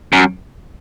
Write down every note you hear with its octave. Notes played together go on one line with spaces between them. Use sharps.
F#2